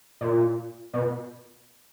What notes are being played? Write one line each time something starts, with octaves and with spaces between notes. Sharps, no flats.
A#2
B2